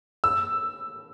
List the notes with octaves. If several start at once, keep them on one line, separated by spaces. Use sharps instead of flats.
E6